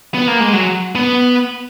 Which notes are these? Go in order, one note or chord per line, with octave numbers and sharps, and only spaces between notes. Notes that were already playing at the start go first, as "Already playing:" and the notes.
B3
A#3
G#3
F#3
B3